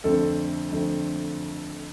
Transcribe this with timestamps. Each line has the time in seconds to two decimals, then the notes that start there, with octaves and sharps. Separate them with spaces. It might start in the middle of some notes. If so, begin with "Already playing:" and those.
0.04 F2 D3 A3 C4 A4
0.72 F2 D3 A3 C4